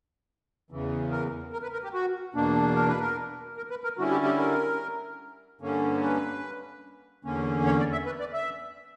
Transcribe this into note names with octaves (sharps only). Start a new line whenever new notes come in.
E2 C#3 E3
A#4
A#4
B4
A#4
G4
F#4
E2 B2 A#3 D4
A#4
B4
A#4
A#4
B4
A#4
D3 G3 C#4 E4 F#4
G4
G4
A#4
G2 D3 A#3 C#4
B4
E2 D3 A#3 C#4
C#5
D5
E5
B4
D5
E5